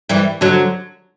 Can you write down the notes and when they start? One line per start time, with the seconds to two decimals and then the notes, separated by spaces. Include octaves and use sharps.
0.09 E3 G3
0.41 D3 F#3